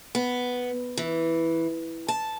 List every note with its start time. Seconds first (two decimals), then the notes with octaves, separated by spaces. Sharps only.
0.15 B3
0.97 E3
2.08 A5